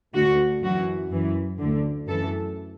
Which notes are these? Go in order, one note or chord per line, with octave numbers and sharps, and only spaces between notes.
D2 D3 F#4
F#2 E3 F#4
F#2 E3
D2 D3
F#2 E3 A4